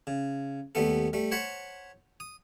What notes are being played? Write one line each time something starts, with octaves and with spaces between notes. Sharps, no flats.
C#3
D#2 G3 A3 B3 A4
G3 A3
C5 C#5 F#5 A5 B5
D#6